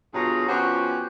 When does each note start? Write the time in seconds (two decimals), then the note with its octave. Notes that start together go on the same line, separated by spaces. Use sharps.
0.13 G2 B2 F4 G#4 C#5 A#5
0.48 F3 B3 C#4 F#4 G4